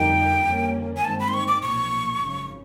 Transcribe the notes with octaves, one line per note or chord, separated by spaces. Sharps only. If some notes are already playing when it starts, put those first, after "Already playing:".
Already playing: F2 D3 G3 A#3 D#4 G5
F2 D3 G3 A#3 C#4
G#5
G2 D#3 G#3 C4 A5
B5
C6
C#6
D6
B1 A#2 F3 C#6
G#1 F#2 C#3 F3